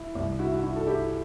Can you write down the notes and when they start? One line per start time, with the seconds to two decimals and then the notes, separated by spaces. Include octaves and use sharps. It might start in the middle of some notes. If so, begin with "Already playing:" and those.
Already playing: E4
0.15 C2
0.39 E4 F#4
0.52 F#4
0.63 E4 F#4
0.76 A4
0.87 E4 G4